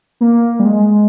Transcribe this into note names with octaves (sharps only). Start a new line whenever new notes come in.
A#3
G3
G#3